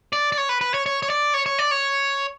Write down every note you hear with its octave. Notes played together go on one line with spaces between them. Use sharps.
D5
D5
C#5
B4
B4
C#5
C#5
C#5
D5
C#5
C#5
D5
C#5